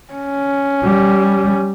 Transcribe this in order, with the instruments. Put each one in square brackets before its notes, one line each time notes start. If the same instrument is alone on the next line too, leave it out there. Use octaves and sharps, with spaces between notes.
[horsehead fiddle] C#4
[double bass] G3